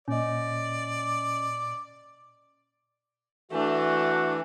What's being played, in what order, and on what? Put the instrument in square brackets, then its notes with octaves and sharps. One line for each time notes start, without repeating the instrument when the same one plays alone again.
[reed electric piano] A#2 [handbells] C#4 D#5 [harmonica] D5
[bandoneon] E3 [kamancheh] A3 D4 [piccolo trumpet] F#4